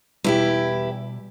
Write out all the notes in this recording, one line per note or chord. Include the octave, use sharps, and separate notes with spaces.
E2 B2 G3 E4 G4